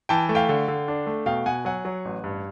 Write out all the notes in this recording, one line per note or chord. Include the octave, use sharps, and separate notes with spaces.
E3 G5 A5
A3
F5 G5
D3
D3
D4
A3
B2 F5 G5
B2 F#5 G#5
F#3 F#5 G#5
F#3
A1
G2